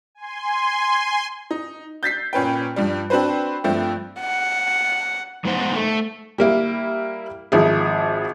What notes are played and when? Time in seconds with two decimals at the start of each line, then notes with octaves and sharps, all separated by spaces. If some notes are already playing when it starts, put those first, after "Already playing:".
0.15 G#5 C6
1.51 D#4
2.03 G6 A6 B6 C7
2.33 A#2 C#4 B4 G5
2.76 G2 F3 G3
3.10 C4 D4 F#4 B4 C5
3.64 G2 F3 A3 C4
4.20 F#5
5.45 F2 G#3 B3 D#4 C5 F#5
5.76 A3
6.38 G3 A#3 E4
7.52 G#1 F3 E4 G#4